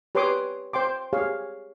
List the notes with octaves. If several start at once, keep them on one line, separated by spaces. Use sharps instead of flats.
G4 B4 C#5 C6 D6 D#6
C5 G5 C6 D6
G4 G#4 C#5 F5